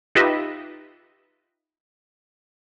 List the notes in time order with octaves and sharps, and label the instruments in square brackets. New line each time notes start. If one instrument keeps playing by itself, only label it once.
[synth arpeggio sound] D#4 F4 G4 B4 D#5 E5